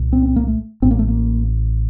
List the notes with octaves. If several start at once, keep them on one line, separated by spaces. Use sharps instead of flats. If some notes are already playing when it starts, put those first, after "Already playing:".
Already playing: C2 A#2
C4
C4
A#3
A3
A1 A2 C4
A#3
A3
A#3